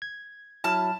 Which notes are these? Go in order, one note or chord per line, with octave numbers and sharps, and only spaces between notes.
G#6
F#3 E4 A5 F6